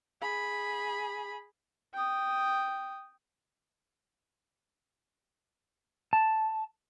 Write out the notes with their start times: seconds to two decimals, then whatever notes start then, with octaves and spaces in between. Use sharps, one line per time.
0.22 G#4 B5
1.94 G5 D#6
6.13 A5